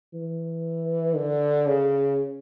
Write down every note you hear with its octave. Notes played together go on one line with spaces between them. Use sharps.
E3
D3
C#3